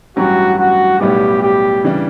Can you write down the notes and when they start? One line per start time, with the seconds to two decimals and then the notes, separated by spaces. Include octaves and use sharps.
0.17 A1 G2 F#3 C#4 F#4 G4
0.58 F#4
1.00 B1 A2 G3 B3 G4
1.42 G4
1.84 C#3 E3 G3 D4